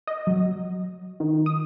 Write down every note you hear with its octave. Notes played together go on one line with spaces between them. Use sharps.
D#5
F#3
D#3
D#6